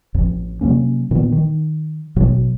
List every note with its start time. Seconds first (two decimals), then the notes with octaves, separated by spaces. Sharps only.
0.14 A1 F2
0.61 C3 F#3 A#3 C#4
1.11 A#2 D#3 B3
1.32 D#3
2.16 A1 B2 F#3